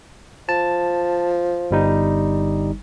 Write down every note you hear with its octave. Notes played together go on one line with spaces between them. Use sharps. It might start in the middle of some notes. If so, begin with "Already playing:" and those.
F3 A5
G1 G3 D#4